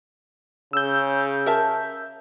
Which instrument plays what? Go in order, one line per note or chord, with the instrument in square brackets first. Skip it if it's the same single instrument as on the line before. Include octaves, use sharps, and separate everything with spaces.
[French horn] C#3 [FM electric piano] E6 G6
[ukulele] A#4 E5 A5